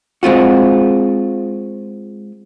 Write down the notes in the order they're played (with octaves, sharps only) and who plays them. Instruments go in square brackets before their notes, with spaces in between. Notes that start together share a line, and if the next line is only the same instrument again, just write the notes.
[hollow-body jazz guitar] G#3 C4 F4 F#4